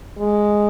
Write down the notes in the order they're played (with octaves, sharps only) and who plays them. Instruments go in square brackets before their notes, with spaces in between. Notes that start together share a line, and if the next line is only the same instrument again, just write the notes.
[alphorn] G#3